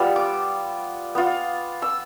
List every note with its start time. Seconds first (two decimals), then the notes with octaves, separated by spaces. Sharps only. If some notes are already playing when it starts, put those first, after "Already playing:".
Already playing: G3 B3 F4 E6
0.16 D6
1.15 B3 F4
1.82 E6